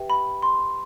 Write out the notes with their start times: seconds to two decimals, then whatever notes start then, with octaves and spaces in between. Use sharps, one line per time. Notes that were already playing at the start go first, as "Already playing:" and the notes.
Already playing: G4 B4 E5 G5
0.10 B5
0.42 C6